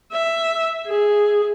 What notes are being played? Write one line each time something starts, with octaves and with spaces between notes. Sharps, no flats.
E5
G#4